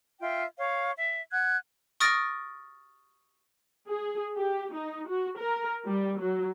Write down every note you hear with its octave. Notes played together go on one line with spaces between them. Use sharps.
F4 E5 G5
C#5 F5
E5
F#5 F#6 G#6
C#6 D#6 F6 A6 A#6 D7
G#4
G4
D#4
F#4
A#4
G3
F#3